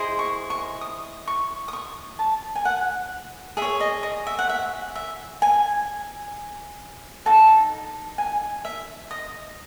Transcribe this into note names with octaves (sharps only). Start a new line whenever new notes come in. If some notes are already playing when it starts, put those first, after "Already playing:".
Already playing: E4 G#4 C5 D#5
C#6
C#6
D#6
C#6
D#6
C#6
A5
G#5
F#5
G#4 E5
C#5
D#5
D#5
E5
F#5
E5
E5
G#5
D#4 F#4 A4 A5
G#5
E5
D#5